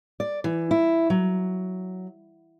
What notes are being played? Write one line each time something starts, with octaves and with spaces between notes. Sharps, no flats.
D5
E3
E4
F#3